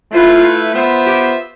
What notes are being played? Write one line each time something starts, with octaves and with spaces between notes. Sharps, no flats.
A3 E4 F4 B4 F5
B3 F4 C5 E5
G4